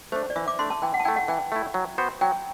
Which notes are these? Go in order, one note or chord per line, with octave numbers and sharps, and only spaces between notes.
A3 D4 C5
D5
E3 E5
D6
A3 D4 C6
A5
E3 G5
F#5
A5
A3 E4 G5
F#5
E3 G5
A3 E4
F#3
B3 F#4 C5
F#3 G5